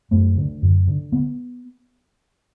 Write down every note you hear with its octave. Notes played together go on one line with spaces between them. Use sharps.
F#2 A3
D3
F#2
D3
B3